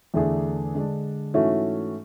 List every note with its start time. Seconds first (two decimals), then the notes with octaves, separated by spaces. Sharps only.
0.14 E2 D3 A3 D4 G#4
0.74 D3 G#3 D4
1.34 G#2 E3 A3 C#4 F#4